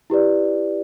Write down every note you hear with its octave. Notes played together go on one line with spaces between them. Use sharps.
E4 G4 B4 D5